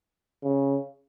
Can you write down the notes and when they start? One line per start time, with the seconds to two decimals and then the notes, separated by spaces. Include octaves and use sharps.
0.44 C#3